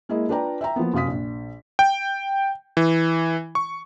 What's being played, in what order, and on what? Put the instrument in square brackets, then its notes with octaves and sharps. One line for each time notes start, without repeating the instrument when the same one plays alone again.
[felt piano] G#3 A#3 E4 G#4 D#5
D4 F4 B4 D5 G5 A#5
E5 G5 A#5
F3 A#3 B3
F#2 C3 F5 D#6 B6
A#1
[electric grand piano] G5
E3
C#6